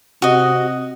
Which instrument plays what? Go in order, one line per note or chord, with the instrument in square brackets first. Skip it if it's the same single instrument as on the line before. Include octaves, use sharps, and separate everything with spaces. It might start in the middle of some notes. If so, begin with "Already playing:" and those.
[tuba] C3 [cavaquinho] F#4 D#5